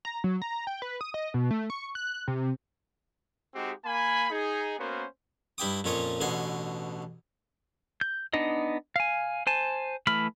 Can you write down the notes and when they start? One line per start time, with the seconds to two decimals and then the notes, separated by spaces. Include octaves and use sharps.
0.05 A#5
0.24 F#3
0.42 A#5
0.67 G5
0.82 B4
1.01 D#6
1.14 D#5
1.34 B2
1.51 A3
1.70 C#6
1.95 F#6
2.28 C3
3.55 G#3 C4 D#4 F#4 G4
3.85 A#3 G#5 B5
4.31 D#4 G#4
4.78 A#3 B3 C#4 F#4 A#4 C5
5.58 G2 E4 D#5 G5 D6 D#6
5.84 F2 A#2 C#4 F4 C#5 D#5
6.21 A1 B2 D3 D#5 F5 G#5
8.01 G6
8.33 B3 D4 D#4 D#5
8.96 F5 G#5
9.47 C5 G#5 A5
10.07 E3 A3 B5 F6